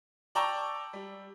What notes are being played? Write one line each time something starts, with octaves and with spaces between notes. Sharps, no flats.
D5 G5 A5 A#5 C#6 E6
G3